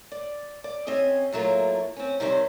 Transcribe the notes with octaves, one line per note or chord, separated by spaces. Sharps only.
D5
D5
C4 C#4 G#4 D#5
A2 F#3 A3 A#3 F4
C4 C#4
C3 D#3 G3 C#4 F4 C5